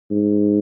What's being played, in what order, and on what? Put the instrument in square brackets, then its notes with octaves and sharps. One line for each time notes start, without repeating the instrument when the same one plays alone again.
[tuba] G#2